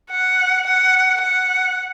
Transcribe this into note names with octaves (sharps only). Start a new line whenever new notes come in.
F#5
F#5
F#5